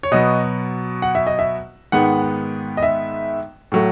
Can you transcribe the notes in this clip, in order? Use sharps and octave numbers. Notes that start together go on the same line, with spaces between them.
C#5
B2 F#3 B3 D#5
F#5
E5
D#5
E5
G#2 D#3 G#3 B3 F#5
D#5
E5
A2 F#3 A3